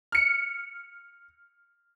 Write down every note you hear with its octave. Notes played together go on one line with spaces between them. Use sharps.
F6 C#7